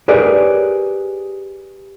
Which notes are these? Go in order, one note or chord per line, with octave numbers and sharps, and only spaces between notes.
G4 G#4 A#4 B4 C#5 D5